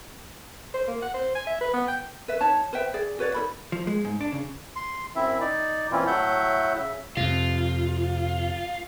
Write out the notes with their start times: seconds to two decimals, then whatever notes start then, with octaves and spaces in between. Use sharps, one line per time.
0.74 C5
0.87 A#3
1.02 F#5
1.14 C5
1.35 G#5
1.47 E5
1.61 B4
1.73 B3
1.88 G5
2.28 B4 E5
2.41 D#4 C#5 A5
2.73 B4 C5 E5 G5
2.94 G#4 D5
3.19 F#4 B4 C#5 D5
3.34 D#4 A4 B5
3.72 F3
3.87 G#3
4.05 G#2
4.21 D4
4.32 C#3
4.76 C6
5.16 F#2 C4 E4 E5
5.41 D#4 D5
5.92 A#2 E3 C4 C#4 E4 F4
6.07 A2 F#3 A3 E5 F#5 G6
6.77 C#3 E5
7.17 F2 C3 F4